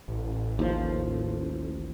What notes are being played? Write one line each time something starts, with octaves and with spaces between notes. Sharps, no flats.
A1
D#2 F3